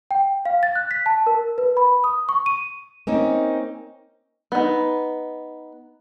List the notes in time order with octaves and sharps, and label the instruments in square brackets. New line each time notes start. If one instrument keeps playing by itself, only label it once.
[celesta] G5
F5
A6
F#6
B6
A5
A#4
B4
B5
D#6
C#6
D#7
[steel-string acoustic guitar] A#3 C4 C#4 D#4
[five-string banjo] B3 D#4